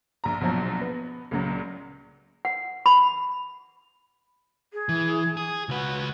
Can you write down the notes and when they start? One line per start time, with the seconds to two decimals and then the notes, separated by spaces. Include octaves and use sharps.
0.24 A#1 A#5
0.41 A#1 B2 F3 F#3
0.81 B3
1.31 C#2 A#2 C#3 F#3
2.45 F#5
2.86 B5
4.73 G#4
4.89 E3
5.37 G#4
5.69 C#2 F#4 B4